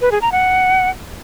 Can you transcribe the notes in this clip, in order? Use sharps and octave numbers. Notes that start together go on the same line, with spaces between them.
B4
G#4
A#5
F#5